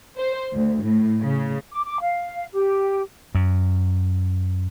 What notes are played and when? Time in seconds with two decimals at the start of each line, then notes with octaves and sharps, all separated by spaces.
0.17 C5
0.53 D2
0.85 A2
1.21 C#3
1.72 D6
1.86 D6
2.01 F5
2.54 G4
3.35 F#2